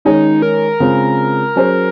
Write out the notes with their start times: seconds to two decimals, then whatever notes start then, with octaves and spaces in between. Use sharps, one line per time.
0.05 D#3 G#3 C#4 D#4 G#4 C#5
0.42 A#4
0.80 C#3 G#3 C4 F4
1.55 F#3 C#4 G#4 C5